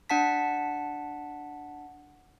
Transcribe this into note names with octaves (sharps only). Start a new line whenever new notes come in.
D4 F#5 A5 B6